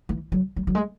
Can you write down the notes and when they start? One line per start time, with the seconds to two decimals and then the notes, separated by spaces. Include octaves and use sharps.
0.09 E3
0.32 F#3
0.56 F#3
0.67 F#3
0.75 G#3